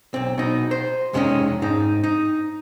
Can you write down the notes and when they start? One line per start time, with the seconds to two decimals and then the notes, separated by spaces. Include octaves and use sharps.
0.14 B1 C4
0.38 B2 D#4
0.71 C5
1.13 F2 C3 G#3 A3 C#4 D#4
1.62 G#2 C4 D#4
2.04 D#4